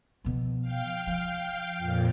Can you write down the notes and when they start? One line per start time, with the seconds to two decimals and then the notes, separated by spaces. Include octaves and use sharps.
0.24 B2 F3
0.62 F5 G5
1.07 F3
1.77 F2 A#2